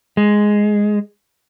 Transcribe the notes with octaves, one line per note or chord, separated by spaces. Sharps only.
G#3